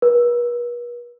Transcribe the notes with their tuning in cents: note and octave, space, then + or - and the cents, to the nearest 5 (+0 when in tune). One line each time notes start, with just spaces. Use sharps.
B4 -45